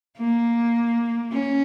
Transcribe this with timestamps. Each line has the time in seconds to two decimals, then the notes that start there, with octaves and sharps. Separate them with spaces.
0.18 A#3
1.33 C#4